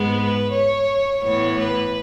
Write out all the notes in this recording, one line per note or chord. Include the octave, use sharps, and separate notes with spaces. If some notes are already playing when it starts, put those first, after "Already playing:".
Already playing: G#2 G#3 B3
B4
C#5
A2 E3 B3 C#5
B4